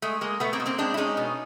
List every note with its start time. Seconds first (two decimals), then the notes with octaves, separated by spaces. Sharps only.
0.02 G#3 A3
0.21 G#3 A#3
0.40 B2 A3 B3
0.53 A#3 C4
0.60 B2
0.66 A#3 C4
0.78 G#3 C4 D4
0.94 E4
0.97 G#3 C#4 D#4
1.17 B2